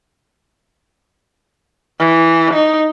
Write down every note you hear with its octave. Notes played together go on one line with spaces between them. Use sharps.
E3
D#4